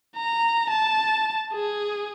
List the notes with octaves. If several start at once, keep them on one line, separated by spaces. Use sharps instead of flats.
A#5
A5
G#4